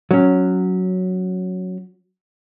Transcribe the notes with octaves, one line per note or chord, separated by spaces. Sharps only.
F#3 C#4